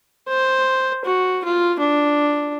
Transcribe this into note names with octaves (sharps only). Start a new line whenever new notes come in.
C5
F#4
F4
D4